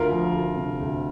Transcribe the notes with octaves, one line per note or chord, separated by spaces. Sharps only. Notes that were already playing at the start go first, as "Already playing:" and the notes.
Already playing: D2 F4 A#4
F3
D2
C3
D2